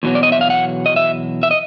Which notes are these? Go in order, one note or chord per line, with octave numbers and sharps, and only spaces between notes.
E2 B2 F#3
D5
D#5
E5
F5
F#5
D#5
E5
E5
D#5